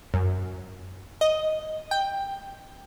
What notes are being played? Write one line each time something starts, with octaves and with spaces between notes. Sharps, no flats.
F#2
D#5
G5